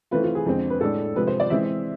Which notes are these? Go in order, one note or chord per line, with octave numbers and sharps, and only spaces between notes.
E3 A3 C4 F4 B4
F4
G#4
F2 D3 G#3 C4
B4
A2 G#3 D4 A4
C3 F3 G#3 B4
C5
D5
E3 G#3 C4 E5